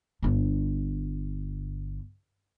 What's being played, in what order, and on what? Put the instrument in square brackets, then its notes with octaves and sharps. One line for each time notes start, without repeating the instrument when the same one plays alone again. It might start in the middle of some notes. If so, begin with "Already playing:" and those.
[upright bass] G1 D4